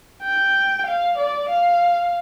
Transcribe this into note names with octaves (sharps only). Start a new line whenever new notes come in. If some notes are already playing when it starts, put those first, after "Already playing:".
G5
F5
D5
F5